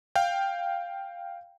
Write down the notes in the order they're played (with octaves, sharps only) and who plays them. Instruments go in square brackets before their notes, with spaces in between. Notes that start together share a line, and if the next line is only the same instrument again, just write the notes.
[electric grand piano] F5 G5